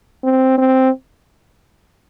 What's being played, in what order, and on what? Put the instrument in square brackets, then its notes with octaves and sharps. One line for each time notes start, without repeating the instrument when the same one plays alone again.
[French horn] C4
C4